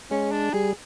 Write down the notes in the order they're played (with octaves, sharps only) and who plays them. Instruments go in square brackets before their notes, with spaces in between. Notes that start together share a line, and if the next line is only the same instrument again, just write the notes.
[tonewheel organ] G#3 [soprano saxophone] C#4
[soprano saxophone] D4
[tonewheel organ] G3 [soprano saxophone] G#4